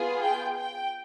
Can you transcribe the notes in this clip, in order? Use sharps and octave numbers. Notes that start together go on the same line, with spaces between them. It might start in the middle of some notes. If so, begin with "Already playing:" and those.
Already playing: B3 F4 G#4
G5
G5